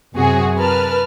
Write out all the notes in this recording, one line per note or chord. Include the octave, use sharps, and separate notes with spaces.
F#2 C3 F#4 G#4
A#4 B4 A5 F6